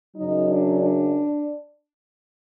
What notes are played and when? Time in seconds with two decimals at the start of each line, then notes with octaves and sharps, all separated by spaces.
0.16 F#2 C#3 F#3 D#4
0.49 D4
0.82 D4